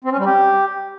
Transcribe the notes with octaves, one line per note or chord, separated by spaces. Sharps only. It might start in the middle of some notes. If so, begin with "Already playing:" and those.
C4
C#4
G3
G4